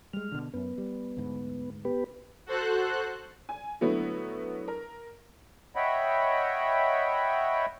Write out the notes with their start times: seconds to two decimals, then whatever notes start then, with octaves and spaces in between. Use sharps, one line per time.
0.13 G3 G#3 F6
0.32 B2 D3
0.54 F#2 B3
0.78 G3
1.17 D2 G#2
1.85 B3 G4 B4
2.46 F#4 A4 C5 F#6
3.49 G#5
3.81 D3 F#3 A3 B3 E4
4.68 A#4
5.76 C#5 D#5 E5 F#5 G5 B5